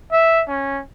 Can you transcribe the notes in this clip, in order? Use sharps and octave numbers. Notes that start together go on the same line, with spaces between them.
E5
C#4